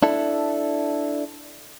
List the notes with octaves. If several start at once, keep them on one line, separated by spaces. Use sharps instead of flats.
D4 E4 A4